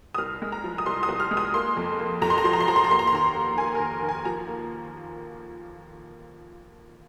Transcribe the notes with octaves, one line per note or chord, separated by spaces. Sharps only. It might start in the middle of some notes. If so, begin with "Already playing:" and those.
D#6
C2 F6
G#3
A#5
F3
D#6
C2 C6
D#6
C2
F6
G#3
D#6
A#3 C6
F2
A#3
F2 A#5
C6
A#5
F3 C6
A#5
C6
F3 A#5
C6
A#5
A#3 C6
A#5
C6
D#2 A#5
A#3
A#3 G#5
A#4
D#2
D#2
G#5
F3 A#5
A#3